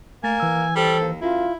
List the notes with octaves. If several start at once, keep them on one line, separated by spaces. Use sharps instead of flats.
A3 A#3 G#5 A6
E3 E6
G3 A4 C5
D#2
F#2 E4 F4